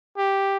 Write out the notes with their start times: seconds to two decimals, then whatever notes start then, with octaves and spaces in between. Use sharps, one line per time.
0.17 G4